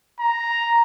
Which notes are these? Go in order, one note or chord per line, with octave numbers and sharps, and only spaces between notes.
A#5